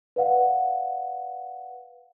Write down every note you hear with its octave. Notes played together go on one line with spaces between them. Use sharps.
B4 D5 F5 F#5